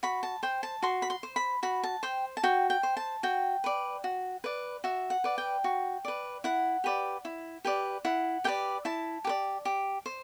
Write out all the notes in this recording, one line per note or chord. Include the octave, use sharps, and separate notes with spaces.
F#4 B5
A5
C5 G5
A5
F#4 C6
B5
C6
C5
B5
F#4 B5
A5
C5 G5
A5
F#4 G5
G5
C5
A5
F#4 G5
B4 D5
F#4
B4 D5
F#4 E5
F#5
B4 D5
G5
F#4
B4 D5
E4 F#5
G4 B4 D5
E4
G4 B4 D5
E4 F#5
G4 B4 D5 G5
E4 A5
G4 B4 D5
G4
C5